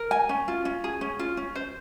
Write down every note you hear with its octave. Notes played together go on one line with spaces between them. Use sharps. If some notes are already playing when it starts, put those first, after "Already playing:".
Already playing: A#4
G#5
C#4
F4
C#4
G#4
C#4
F4
C#4
C5